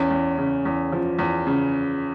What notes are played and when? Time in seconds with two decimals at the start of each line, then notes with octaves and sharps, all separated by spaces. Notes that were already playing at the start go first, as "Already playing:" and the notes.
Already playing: E2 C#4
0.11 E2
0.38 C#3
0.65 E2
0.92 F3
1.19 E2
1.47 C#3